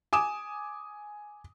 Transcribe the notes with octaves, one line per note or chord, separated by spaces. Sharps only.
G#5 D6 D#6 E7